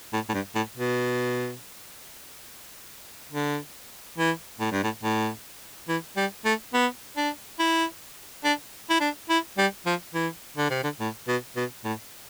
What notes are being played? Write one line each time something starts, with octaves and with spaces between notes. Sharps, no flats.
A2
A2
G2
A2
B2
D3
E3
A2
G2
A2
A2
E3
G3
A3
B3
D4
E4
D4
E4
D4
E4
G3
F3
E3
D3
C3
D3
A2
B2
B2
A2